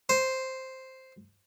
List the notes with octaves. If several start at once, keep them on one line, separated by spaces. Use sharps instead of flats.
C5